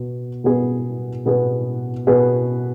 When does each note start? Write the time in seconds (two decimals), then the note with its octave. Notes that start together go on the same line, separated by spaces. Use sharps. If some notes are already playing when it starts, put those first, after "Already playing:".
Already playing: B2 B3
0.44 B2 B3 G#4 B4
1.26 B2 B3 G#4 B4
2.07 B2 B3 G#4 B4